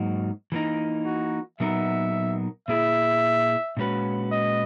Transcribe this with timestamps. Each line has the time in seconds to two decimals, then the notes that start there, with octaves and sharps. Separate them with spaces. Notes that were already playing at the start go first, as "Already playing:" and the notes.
Already playing: G#2 F#3 A#3 D#4 F#4
0.52 E3 A#3 D#4
1.06 F#4
1.60 A#2 F#3 B3 D#4 A#4 E5
2.68 A#2 A#3 E4 G#4 E5
3.77 A#2 G#3 C#4 F#4 B4
4.32 D#5